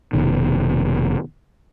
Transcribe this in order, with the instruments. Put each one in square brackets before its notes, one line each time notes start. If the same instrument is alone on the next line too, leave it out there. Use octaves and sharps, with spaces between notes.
[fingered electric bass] F1 B2 D#3